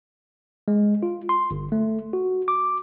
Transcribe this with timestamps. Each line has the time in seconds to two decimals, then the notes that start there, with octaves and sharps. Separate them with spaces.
0.68 G#3
1.03 F4
1.29 C6
1.51 G1
1.72 A3
2.13 F#4
2.48 D6